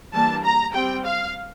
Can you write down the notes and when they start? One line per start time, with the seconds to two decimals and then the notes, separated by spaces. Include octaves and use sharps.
0.12 E3 G3 A#3 D4 A5
0.44 A#5
0.74 G3 C4 G5
1.04 F5